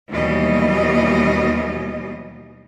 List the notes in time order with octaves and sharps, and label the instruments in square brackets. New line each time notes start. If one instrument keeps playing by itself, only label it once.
[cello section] D#2 B2 E3 F#3 G3 D#5